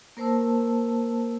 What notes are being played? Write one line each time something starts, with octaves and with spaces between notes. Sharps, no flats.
A#3 A#4 C5 A5 E6